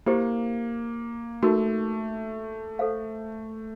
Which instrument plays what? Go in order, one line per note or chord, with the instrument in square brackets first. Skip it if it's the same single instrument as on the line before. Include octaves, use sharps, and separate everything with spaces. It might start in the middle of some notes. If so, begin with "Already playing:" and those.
[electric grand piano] A#3 [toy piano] E4 G4 C5
[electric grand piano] A3 [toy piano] D#4 F#4 A#4
[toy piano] A4 C5 F5